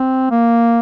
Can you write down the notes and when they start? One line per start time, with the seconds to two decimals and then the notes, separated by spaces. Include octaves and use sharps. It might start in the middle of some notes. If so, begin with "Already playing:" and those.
Already playing: C4
0.31 A#3